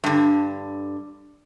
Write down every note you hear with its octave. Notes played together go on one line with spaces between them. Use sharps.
G2 D3